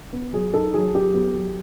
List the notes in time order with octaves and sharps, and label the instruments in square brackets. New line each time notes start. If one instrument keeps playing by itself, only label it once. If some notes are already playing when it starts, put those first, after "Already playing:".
[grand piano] B3
F#3 G#4
D#4 A4
F#3 G#4
F#3 G4
B3
F#3